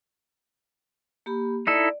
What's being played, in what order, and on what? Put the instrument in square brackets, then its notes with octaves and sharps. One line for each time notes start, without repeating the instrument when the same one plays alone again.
[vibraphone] A#3 G4 B5
[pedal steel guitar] D#4 E4 A4 [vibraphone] D5